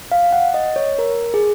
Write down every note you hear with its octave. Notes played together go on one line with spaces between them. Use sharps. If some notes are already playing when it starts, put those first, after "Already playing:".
F5
F#5
D#5
C#5
A#4
G#4